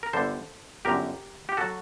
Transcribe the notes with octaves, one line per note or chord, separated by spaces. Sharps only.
A#4
G1 G2 D3 A4 C5
G1 F#2 D3 G4 A#4
G4
F#3 F#4 A4